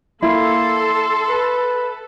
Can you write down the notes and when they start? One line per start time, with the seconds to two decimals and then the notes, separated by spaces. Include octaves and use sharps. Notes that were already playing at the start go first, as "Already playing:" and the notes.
0.23 A#3 E4 A4 C6
1.29 B4